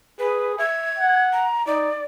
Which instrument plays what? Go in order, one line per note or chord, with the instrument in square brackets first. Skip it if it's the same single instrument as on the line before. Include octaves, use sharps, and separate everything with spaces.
[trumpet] G#4 [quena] B4
[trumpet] E5 [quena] G#6
[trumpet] F#5
[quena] A#5
[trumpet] D#4 [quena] D5